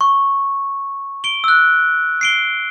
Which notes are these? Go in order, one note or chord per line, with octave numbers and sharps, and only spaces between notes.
C#6
D7 G7
E6 F#6
C7 D7 G7